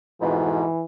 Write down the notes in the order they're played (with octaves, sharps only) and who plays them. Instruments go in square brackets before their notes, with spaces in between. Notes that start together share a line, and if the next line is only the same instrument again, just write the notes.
[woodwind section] F2 G#2 B2 [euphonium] E3